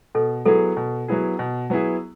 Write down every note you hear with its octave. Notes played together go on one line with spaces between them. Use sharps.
B2 A4
F#3 B3 E4 G#4 A4
B2
F#3 B3 E4 G#4
B2
F#3 B3 E4 G#4